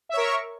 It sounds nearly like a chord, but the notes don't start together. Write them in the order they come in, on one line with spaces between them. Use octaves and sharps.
E5 C#5 A#4 C#6